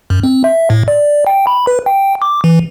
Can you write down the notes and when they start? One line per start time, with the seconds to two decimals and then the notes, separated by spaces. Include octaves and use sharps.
0.10 F#2
0.24 C4
0.44 E5
0.70 A2
0.88 D5
1.27 G5
1.47 B5
1.67 B4
1.86 G5
2.22 D6
2.44 E3